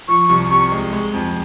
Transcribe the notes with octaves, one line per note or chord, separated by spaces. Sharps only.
F3 C#6
C2
C3 C#6
G#3
G#3
F2